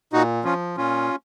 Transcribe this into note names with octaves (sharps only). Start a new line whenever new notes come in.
A#2 D#4 F#4
F3 C#4 F4
A#2 C#4 F4